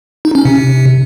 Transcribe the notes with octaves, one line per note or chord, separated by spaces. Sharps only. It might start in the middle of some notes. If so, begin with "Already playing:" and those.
D#4
C#4
C3